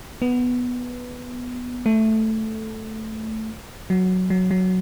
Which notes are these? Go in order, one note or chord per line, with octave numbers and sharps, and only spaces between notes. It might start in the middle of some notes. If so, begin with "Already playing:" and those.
B3
A3
F#3
F#3
F#3